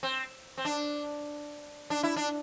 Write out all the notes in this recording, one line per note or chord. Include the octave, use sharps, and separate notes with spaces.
C4
C4
D4
D4
E4
D4